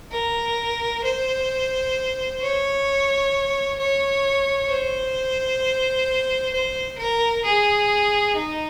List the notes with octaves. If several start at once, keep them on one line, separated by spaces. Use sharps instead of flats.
A#4
C5
C#5
C#5
C5
C5
A#4
G#4
D#4